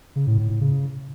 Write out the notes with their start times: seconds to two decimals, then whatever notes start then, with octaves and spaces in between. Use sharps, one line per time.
0.16 C#3
0.27 A2
0.38 A2
0.50 A2
0.61 C#3